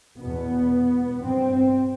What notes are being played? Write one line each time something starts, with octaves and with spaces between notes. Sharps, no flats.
E2 B2 B3
G2 C4